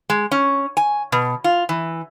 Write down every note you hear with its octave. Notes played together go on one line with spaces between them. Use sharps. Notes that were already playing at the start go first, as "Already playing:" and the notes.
G#3
C#4
G#5
B2
F4
E3